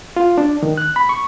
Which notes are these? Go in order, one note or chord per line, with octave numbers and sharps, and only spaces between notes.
F4
D4
D#3
F#6
B5
C#6